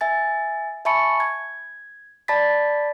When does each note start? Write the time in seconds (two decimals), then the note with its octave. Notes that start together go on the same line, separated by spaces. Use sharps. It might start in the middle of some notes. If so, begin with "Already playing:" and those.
0.01 E5 G#5 A6
0.85 E5 G#5 A5 B5 C#6 C#7
1.20 G#6
2.28 D5 A5 B5 A6 B6